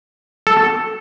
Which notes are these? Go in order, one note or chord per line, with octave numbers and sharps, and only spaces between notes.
A4